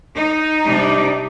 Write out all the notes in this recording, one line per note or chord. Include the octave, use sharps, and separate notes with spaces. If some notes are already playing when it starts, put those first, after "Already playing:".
D#4
C3 G3 D4